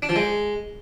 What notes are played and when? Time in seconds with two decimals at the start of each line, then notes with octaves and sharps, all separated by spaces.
0.02 D4
0.09 F3
0.16 G#3